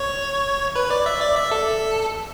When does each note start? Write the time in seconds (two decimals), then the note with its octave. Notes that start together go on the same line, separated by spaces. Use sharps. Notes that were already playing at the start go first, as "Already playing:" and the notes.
Already playing: C#5
0.76 B4
0.91 D5
1.06 E5
1.21 D5
1.36 E5
1.51 A4